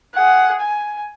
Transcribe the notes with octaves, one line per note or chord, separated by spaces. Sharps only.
G#4 F#5
G#5